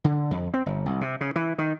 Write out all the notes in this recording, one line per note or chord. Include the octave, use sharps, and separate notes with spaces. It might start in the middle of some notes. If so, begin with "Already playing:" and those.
D3
F2
C4
G1
C2
C3
C#3
E3
D#3